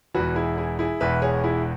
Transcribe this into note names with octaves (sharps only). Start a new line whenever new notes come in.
E1 E2 E3 F#4 B4
E4 G#4
E4 G#4
E4 G#4
E1 E2 E3 B4 E5
G#4 C#5
E4 G#4